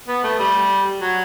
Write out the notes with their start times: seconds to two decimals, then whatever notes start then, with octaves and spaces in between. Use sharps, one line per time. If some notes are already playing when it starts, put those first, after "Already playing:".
0.08 B3
0.24 A3
0.39 G3
1.01 F#3